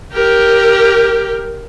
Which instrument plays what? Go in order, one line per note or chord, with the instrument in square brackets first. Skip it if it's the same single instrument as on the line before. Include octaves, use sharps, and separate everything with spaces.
[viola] G4 A#4